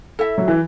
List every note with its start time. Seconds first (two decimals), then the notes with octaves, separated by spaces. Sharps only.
0.19 E4 A4 E5
0.38 F#3
0.48 E3